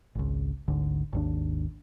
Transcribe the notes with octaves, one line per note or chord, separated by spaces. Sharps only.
G#1 C#2
G#1 D2 D3
G#1 D#2 D4